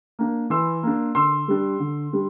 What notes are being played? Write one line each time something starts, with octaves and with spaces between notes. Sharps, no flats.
A#3 D4
E3 C6 E6
A#3 D4
D3 C6 E6
G3 D4
D3
G3 D4